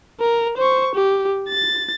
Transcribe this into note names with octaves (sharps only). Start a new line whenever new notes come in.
A#4
C5 C#6
G4
A6